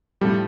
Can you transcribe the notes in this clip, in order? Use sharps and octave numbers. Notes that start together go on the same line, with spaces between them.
A2 F3 G3 A3 D4